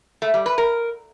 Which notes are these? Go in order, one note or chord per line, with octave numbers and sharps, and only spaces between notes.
A3
G3
B4
A#4